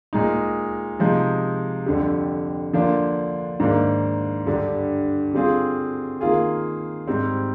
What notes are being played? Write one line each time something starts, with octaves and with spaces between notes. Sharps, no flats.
A#2 G#3 D#4
C3 F3 G#3 D#4
F2 D3 G3
D3 F3 A#3 D4
G#2 D#3 A#3 D4
G2 D3 G3 D4
D3 G3 C4 F4 G#4
D#3 A#3 F4 G#4
G#2 G3 C4